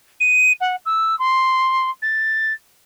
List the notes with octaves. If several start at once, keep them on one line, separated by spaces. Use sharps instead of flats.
D#7
F#5
E6
C6
A6